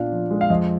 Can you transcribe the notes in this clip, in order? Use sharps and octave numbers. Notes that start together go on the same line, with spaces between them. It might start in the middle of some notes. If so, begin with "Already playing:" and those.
Already playing: A#2 B3 D4 F5
F3
G#3
F5
F2 D#5